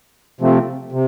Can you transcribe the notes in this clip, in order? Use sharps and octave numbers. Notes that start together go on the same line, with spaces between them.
C3 F3 A3 C4
C3